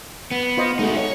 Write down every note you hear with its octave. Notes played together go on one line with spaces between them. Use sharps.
B3
F4 C5 D#5
G#3 A3 D#4 F#4
C#5